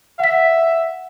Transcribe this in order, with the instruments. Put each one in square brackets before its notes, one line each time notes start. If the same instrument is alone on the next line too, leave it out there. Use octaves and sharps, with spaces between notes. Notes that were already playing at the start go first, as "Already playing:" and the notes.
[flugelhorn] E5 [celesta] F#5 B6